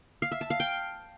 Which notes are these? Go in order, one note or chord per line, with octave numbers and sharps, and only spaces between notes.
F5
E5
A5
F5
G5